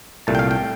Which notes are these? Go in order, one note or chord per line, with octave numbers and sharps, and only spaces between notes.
C2 A#2 A3 A5
G5
F5
G5